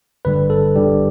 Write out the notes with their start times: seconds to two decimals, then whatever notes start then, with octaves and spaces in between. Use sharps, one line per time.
0.25 G1 G2 D3 G3 B4
0.50 A4
0.76 G1 G2 D3 G3 G4